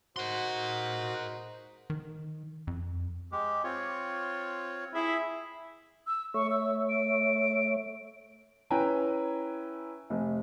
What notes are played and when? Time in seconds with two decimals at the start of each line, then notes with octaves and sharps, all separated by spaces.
0.16 G#3 D#4 F#4 A#4 C5 C6
1.90 D#3
2.67 F2
3.32 G#3 G4
3.64 C4 F4 C#5
4.94 E4 G#4 E5
6.07 E6
6.34 A3 C#5 E5 C#6
6.50 E6
6.89 D7
8.70 C#4 E4 B4 G5 G#5 A#5
10.10 F1